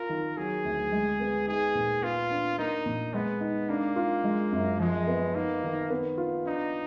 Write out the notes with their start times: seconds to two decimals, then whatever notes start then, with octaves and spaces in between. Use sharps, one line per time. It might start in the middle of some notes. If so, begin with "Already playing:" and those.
Already playing: F4 A#4
0.09 D#3
0.37 F#3 G#4
0.65 D2
0.92 G#3
1.20 B3
1.48 D#4 G#4
1.75 A#2
2.02 B3 F4
2.31 D4
2.58 A#3 D#4
2.86 A#2
3.14 G#3 B3
3.41 D#4
3.69 A#3 D4
3.96 F4
4.24 G#3
4.52 F#2
4.79 F3 G#3
5.07 B3
5.35 A#3 D#4
5.64 D#3
5.90 B3
6.18 F4
6.45 D4 D#4